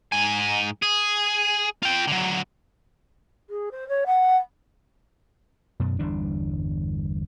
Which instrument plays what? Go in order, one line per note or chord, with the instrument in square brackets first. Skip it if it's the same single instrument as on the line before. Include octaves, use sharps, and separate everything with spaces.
[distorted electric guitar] G#2 G#5
G#4
F4 G5
D3 F#3
[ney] G#4
C5
C#5
F#5
[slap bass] F#2 B2
G1 E2 G3 D4